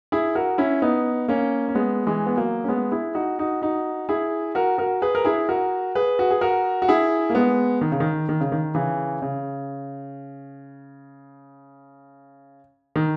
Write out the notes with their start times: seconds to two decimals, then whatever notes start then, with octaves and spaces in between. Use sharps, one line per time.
0.12 E4 G#4
0.35 F#4 A#4
0.58 C#4 E4
0.82 B3 D#4
1.28 A#3 C#4
1.69 C#4
1.75 G#3 B3
2.07 E3 G#3
2.26 B3
2.37 F#3 A#3
2.64 C#4
2.68 G#3 B3
2.92 E4 G#4
3.15 D#4 F#4
3.39 D#4 F#4
3.62 D#4 F#4
4.09 E4 G#4
4.55 F#4 A#4
4.78 F#4 A#4
5.02 G#4 B4
5.15 A#4
5.25 E4 G#4
5.49 F#4 A#4
5.95 G#4 B4
6.19 F#4
6.31 G#4
6.41 F#4 A#4
6.82 F#4
6.88 E4 G#4
7.30 A#3
7.35 G#3 B3
7.81 D#3
7.92 C#3
8.00 D#3
8.29 D#3
8.41 C#3
8.52 D#3
8.75 C#3 E3
9.22 C#3
12.96 D#3